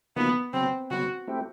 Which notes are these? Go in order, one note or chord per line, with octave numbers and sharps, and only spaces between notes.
C#3 F3 A#3 B3 D#4 F#4
C#3 F#3 B3 C4
C#3 F#3 B3 F#4
A3 C4 E4 G4